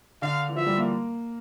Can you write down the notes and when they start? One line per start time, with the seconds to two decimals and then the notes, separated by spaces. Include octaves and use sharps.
0.22 D3 F5
0.49 E3
0.56 F3 E5
0.66 G3
0.77 A#3